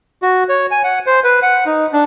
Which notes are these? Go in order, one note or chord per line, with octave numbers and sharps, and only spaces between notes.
F#4
C#5
G#5
F#5
C5
B4
F#5
D#4
D4